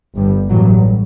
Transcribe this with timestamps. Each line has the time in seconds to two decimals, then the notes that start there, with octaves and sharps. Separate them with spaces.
0.15 G1 G2
0.49 A1 G2 F#3